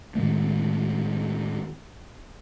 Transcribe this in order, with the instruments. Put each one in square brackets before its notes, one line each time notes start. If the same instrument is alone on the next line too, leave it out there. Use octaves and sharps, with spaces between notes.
[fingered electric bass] A2 D#3 G#3 A3